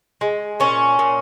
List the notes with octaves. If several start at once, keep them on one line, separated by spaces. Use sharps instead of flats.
G#3
A#2 C#4
A#2